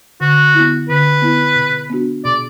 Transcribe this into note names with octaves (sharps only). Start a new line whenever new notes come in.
D3 F#4
B3 E4
D3 B4
B3 E4
B2
B3 D4 F#4
B2 D5